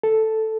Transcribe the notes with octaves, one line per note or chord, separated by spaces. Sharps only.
A4